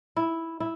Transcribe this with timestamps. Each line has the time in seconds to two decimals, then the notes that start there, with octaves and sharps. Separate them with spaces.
0.16 E4
0.60 E4